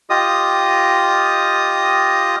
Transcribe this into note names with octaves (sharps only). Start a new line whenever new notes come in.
F4 G4 D#5 D#6